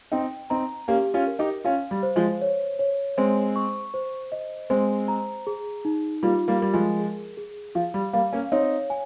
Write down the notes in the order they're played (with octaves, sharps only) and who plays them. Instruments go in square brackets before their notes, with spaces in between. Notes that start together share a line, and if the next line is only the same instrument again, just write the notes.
[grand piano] C4 D#4 [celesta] G5
[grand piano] C4 D#4 [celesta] A#5
[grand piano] A#3 C#4 [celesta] G4
[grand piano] C#4 F4
[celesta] A#4
[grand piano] D#4 G4
[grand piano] C#4 F4 [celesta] F5
[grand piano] G3
[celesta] C5
[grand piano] F3 G#3
[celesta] C#5
C#5
[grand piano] G#3 C4 [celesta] C5
[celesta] C#6
C5
D#5
[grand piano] G#3 C4 [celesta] C5
[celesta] A#5
G#4
D#4
[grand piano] G3 A#3 [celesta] F4
[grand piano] G3 A#3
[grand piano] G3 [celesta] A#4
[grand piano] F3 G#3
[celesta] G#4
G#4
[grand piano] F3 [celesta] F5
[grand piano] G3
[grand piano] G3 A#3 [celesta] F5
[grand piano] A#3 C#4
[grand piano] C4 D#4 [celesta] C#5
[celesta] G#5